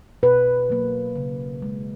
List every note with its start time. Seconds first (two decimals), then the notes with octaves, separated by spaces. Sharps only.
0.23 B2 B4
0.70 F#3 A#3
1.16 C#3
1.62 G#3